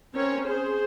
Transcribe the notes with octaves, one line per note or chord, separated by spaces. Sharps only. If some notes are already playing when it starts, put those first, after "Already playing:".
C4 C#4 A#4 C#5
G#4 C5